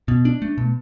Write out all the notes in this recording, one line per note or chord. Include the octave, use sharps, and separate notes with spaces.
B2
D4
A3
B2